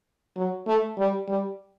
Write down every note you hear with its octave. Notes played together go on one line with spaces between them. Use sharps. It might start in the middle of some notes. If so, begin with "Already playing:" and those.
F#3
A3
G3
G3